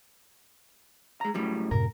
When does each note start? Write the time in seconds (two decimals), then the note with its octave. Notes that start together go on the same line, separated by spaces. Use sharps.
1.21 G#3 A#5
1.34 F#2 A2 G3
1.71 F#2 A2 C3 A#4